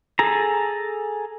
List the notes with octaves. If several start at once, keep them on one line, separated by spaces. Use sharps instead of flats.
G#4 A4 A#5